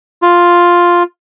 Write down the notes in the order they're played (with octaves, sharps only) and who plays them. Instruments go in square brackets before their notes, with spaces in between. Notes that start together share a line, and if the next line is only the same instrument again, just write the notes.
[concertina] F4